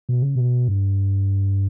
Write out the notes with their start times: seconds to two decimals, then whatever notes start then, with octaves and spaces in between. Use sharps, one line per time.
0.09 B2
0.22 C#3
0.35 B2
0.68 G2